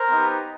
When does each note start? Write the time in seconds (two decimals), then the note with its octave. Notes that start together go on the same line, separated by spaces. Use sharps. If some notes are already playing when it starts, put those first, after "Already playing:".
Already playing: A#4 C5
0.10 B3 D#4 G4